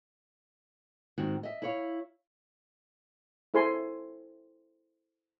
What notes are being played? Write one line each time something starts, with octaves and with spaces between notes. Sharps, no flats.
G#2 D#3 C4 F#4
D#5 E5
E4 C#5 F5
E4 A4 C5 G#5 C6